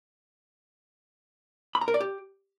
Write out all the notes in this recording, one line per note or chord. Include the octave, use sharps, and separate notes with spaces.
B5
A#5
A#4
D5
G4